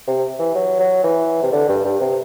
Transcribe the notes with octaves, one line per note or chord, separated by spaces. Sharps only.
C3
E3
F#3
F#3
E3
C3
D3
G2
G2
C3